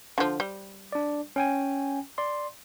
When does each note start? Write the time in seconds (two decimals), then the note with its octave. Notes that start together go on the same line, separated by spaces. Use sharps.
0.18 D3 F3
0.40 G3
0.92 D4 D5
1.36 C#4 G5 G#5
2.18 D5 C6